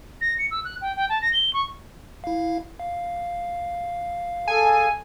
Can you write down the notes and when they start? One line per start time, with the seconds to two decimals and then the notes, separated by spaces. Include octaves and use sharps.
0.21 A#6
0.39 C#7
0.51 E6
0.65 F#6
0.81 G5
0.96 G5
1.09 A5
1.22 A#6
1.33 G7
1.53 C#6
2.24 E4 F5
2.80 F5
4.48 G#4 A4 G#5